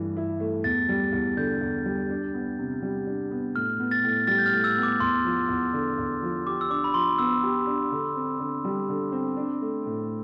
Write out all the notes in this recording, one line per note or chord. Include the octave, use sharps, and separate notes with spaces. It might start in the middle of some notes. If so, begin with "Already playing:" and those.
Already playing: G2 E3 A3
E4
A3
E2 A6
G3
E2
D3 G6
E2
G3
D4
B3
C3
G3
D4
B3
A2 F6
B3
A6
A2
G3 A6
G6
F6
A2
E6
B3
D6
E2 C6
F3
E2
D3
E2
F3
G4 D6
E6
D4 D6
B5
F3 C6
B3 E6
G4
D4
D3
C4
D3
G3
D3
C4
D4
A3
A2